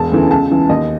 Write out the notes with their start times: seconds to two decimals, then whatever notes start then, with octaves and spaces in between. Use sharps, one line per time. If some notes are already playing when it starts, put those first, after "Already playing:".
Already playing: E1 A5
0.12 D2 C#3 E3
0.30 C#2 A5
0.50 C#3 E3
0.69 D#2 D#5